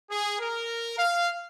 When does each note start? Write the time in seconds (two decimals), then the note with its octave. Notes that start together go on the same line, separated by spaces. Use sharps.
0.10 G#4
0.40 A#4
0.99 F5